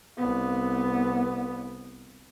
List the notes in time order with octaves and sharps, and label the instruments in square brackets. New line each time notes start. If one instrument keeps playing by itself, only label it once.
[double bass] C2 B3